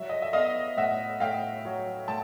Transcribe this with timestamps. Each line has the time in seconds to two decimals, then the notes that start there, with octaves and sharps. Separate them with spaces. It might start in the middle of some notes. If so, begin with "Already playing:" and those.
Already playing: F#3 E5
0.10 D#5
0.22 E5
0.33 B3 D#5 F5
0.77 A2 E5 F#5
1.20 A2 F5 G5
1.65 F#3
2.08 A2 G5 A5